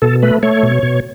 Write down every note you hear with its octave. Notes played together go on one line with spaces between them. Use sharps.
B2 A4
A3 B4
A3 C#5
B2
B2